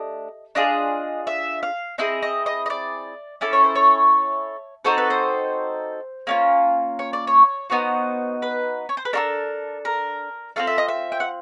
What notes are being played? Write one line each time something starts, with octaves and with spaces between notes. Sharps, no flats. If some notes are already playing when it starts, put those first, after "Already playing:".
Already playing: A3 D4 G4 D#5
D4 F4 G#4 D#5
E5
F5
C4 E4 G#4 D#5
D#5
D#5
D#5
D5
C#4 E4 A4 D5
C#5
C5
C#5
C4 D#4 F#4 A4 C5
B4
C5
A#3 C#4 F4
C#5
D5
C#5
B3 D#4 F#4 C5
B4
C#5
C5
B4
D4 F#4 A4 A#4
A#4
C4 F4 A4 F5
E5
D#5
E5
G5
F#5